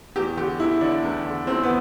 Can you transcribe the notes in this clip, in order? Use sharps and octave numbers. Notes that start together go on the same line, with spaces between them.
E2 G4
D3 G4
E2 E4
D3 D4
E2
D3
E2 C4
B3